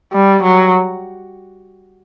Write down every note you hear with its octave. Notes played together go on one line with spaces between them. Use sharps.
G3
F#3